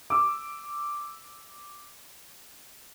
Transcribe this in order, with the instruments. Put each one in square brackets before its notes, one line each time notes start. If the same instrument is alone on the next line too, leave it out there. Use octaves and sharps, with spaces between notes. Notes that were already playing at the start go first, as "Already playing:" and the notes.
[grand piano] D6 E6